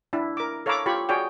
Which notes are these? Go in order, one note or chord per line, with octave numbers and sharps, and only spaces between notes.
D4 E4
A#4 D6
A4 C#5 F5 A#5 B5 D6
F4 G4 C#5 B5 C#6
F#4 G#4 C#5 D5 G5